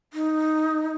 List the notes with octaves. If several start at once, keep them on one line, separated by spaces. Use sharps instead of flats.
D#4